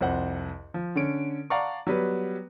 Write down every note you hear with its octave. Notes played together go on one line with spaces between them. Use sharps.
C2 F2 C5 F#5
F3
D3 C#4 D7
D5 F5 F#5 A5 A#5 C#6
F#3 G3 B3 B4